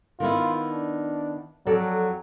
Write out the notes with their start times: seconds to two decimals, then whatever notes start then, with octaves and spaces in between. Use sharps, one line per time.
0.20 D#3 B3 E4 F4
0.71 D4
1.67 F2 F#3 A4 D5